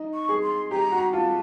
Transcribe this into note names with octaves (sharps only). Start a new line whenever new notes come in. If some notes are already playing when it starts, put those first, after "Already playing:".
Already playing: D#4
C#6
G#4
C6
G4 A#5
F#4
F4 A5